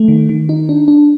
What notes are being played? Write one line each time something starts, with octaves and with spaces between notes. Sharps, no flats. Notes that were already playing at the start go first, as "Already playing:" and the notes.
Already playing: A3
D#3
D#3
D#4
D4
D4